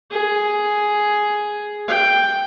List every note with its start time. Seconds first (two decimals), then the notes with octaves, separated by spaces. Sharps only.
0.11 G#4
1.88 G5